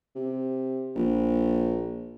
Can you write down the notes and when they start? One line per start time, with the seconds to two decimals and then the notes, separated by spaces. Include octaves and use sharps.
0.15 C3
0.95 A#1